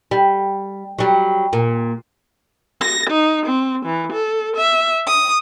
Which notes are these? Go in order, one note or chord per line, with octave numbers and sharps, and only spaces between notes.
G3
F#3 G3
A#2
A#6
D#4
C4
E3
A4
E5
D#6